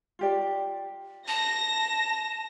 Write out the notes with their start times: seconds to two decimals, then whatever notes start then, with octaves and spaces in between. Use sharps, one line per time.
0.19 F4 G4 D5
1.28 A5 A#6